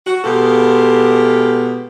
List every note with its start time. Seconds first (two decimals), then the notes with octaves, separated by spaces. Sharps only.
0.07 F#4
0.24 B2 G#3 B3 F4 G4 A4